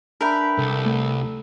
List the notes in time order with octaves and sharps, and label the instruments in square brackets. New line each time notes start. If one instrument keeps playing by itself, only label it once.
[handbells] D4 E5 B5 [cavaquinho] A#4 B4 G5
[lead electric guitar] C2 [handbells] A4
[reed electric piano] A3